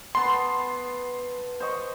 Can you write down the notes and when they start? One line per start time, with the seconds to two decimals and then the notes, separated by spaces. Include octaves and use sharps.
0.15 B3 A5 C6
1.60 C5 D#5 C#6